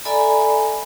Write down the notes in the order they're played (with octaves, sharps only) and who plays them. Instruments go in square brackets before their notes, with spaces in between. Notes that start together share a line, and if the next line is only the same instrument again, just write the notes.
[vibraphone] A4 D5 E5 G#5 A#5 B5